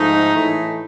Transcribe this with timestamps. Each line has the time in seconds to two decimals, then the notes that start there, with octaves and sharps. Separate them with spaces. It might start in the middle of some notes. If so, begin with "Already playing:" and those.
Already playing: G#2 F3 A3 D#4
0.34 A2 E3 A3